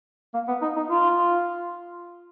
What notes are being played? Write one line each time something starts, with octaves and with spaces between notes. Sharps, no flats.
A#3
B3
D#4
D#4
F4